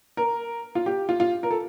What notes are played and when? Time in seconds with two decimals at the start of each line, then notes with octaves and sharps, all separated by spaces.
0.17 A#4
0.75 F4
0.86 G4
1.09 F4
1.20 F4
1.43 A#4
1.51 A4